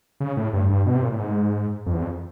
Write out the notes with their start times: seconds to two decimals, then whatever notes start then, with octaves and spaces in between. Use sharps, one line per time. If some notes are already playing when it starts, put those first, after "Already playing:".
0.20 C#3
0.37 A2
0.53 G2
0.70 G2
0.86 B2
0.95 C3
1.03 A#2
1.12 A2
1.20 G#2
1.86 F2
1.94 E2
2.02 F2